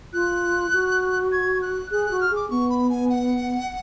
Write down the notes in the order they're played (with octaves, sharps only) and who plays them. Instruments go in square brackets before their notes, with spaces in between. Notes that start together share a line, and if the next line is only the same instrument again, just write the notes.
[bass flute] F4 [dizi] F#6
[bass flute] F#4
[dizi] G#6
F#6
[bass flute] G#4 [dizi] F#6
[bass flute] F#4 [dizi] F#6
[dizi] F6
[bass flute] G#4 [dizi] D6
[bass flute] B3 [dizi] C#6
[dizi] B5
G#5
F#5